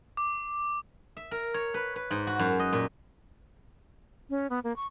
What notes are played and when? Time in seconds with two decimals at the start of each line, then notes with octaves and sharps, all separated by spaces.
0.17 D6
1.17 E5
1.31 A#4
1.54 C#5
1.74 B4
1.96 B4
2.11 G#2
2.27 F#4
2.39 F#2
2.59 D#5
2.72 A#2
4.30 C#4
4.50 B3
4.64 A#3
4.76 C#6